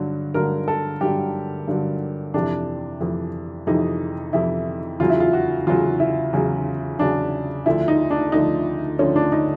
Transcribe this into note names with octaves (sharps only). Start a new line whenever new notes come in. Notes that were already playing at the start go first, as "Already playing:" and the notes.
Already playing: G2 D3 F#3
G2 D3 F#3 A#4
A4
G2 D3 F#3 G4
G2 D3 F#3
F2 C3 E3 D4
F2 C3 E3
F2 C3 E3 D#4
F2 C3 E3 E4
E2 C#3 F#3 F4
E4
F4
F#4
E2 C#3 F#3 F4
E4
E2 C#3 F#3
E2 C#3 F#3 D4
D2 D3 F3 E4
D#4
D4
D2 D3 F3 D#4
D2 D3 F3 C#4
D4
D#4